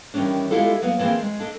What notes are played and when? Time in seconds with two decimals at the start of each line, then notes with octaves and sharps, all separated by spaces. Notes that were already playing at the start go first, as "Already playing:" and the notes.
0.14 D#3 E3 G3 C#4 D4
0.51 G#3 B3 E4 F4 G4 A4
0.82 F#3 A#3 B3
0.99 E3 F3 A#3 C4 G#4
1.19 G#3
1.40 D4 A4 D#5